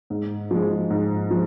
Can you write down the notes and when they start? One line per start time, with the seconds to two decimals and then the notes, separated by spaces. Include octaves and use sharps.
0.10 G#2
0.51 F3 G#3
0.90 G#2
1.31 F3 G#3